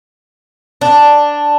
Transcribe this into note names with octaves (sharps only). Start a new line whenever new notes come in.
D4